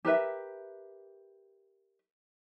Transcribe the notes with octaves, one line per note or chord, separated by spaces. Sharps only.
G4 A#4 B4 E5